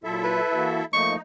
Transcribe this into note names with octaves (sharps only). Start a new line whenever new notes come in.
A#2 F#3 E4 F4 A4 E5
B4
E3 A#3 F#4
F3 A3 A#3 D#4 C#6